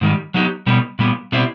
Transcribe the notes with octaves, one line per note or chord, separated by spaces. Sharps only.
G#2 D#3 G3
F#3 B3 D#4 G4
B2 G3 B3
A#2 G3 B3
B2 G3 C4 E4